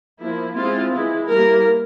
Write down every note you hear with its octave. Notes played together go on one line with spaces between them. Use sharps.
F3 A#3 E4
G#3 C4 E4 F4
E3 G#3 E4
G3 A#3 E4 A#4